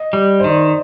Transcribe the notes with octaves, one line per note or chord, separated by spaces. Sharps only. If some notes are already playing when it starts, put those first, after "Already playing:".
Already playing: D#5
G3
C5
D#3 D5